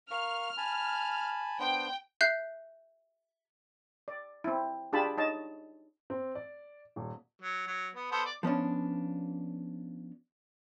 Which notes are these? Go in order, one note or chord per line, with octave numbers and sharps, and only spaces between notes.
A#4 F5 C#6 F6
G#5 A5 B5
B3 D4 C5 G5
E5 F#6 G6 C7
D5
C4 E4
D4 F4 G4 G#4 A5 B5
D#4 C#5 D#5 A5
C4
D5
D#1
F#3
F#3
B3
B3 A4 C5
D5
F3 B3 C#4 D4